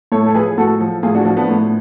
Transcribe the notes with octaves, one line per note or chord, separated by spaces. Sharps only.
A2 A4 C#5
A4
F3 G#4 B4
A2 F#4 A4
F3
A2 F4 G#4
D4 F#4
F3 D4 F#4
B3 D4
A2